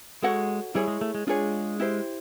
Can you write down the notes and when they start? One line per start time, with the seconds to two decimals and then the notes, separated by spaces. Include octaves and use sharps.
0.23 G#3 F#4 A4 C#5 F#5
0.75 G3 E4 G#4 C#5
0.88 G#3
1.01 A3
1.15 G#3
1.27 G#3 D4 F4 G#4 C#5
1.79 E4 G4 C5